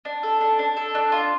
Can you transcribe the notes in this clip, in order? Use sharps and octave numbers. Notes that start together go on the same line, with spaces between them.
D4
A4
D4
D4
A4
D4
F4